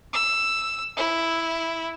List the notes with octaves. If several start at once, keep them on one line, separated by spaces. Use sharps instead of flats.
E6
E4